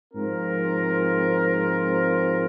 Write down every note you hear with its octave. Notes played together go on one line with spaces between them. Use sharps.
G#2 F3 C4 F4 A#4